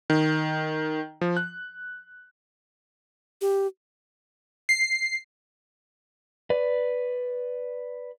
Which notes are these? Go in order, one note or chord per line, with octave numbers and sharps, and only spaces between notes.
D#3
F3
F#6
G4
C7
B4 D5